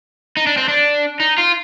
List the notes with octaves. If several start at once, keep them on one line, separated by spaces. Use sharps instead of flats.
D#4
D4
C4
D4
D#4
F4